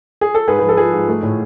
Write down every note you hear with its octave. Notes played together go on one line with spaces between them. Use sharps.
G#4
A4
G#2 G#4 B4
F3 B4
A4
F3 G#4
G#2
A3
A2